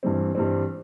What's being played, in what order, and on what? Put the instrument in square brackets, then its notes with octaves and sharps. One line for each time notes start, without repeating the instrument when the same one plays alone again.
[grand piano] G2 E3 G3 C4
G2 E3 G3 C4